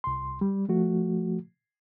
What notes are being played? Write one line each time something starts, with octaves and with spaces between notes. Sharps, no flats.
C2 C6
G3
F3 A3 F#4